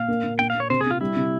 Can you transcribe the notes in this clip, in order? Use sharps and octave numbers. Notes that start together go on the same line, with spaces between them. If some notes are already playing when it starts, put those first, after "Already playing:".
Already playing: A#2 F5
A#3
A#2
A#2 G5
F5
A#3
C#5
C3 C5
G#4
C4 F4
G3 E4
C3